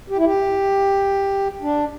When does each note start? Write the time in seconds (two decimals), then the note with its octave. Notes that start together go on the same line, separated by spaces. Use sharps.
0.10 G4
0.17 E4
0.25 G4
1.62 D4